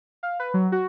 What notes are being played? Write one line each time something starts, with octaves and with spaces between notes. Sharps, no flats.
F5
B4
F#3
F#4